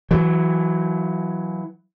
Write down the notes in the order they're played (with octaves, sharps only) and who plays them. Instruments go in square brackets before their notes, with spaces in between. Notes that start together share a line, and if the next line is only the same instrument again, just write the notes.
[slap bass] E3 F#3